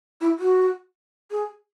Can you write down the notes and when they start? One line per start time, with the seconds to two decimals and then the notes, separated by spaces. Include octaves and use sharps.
0.21 E4
0.39 F#4
1.31 G#4